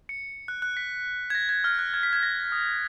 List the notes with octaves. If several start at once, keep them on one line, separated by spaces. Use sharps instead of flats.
C#7
F#6
F#6
B6
G#6
A#6
G#6
F6
F#6
G#6
B6
G#6
A#6
D#6